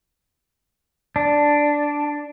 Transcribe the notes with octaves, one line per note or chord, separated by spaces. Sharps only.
D4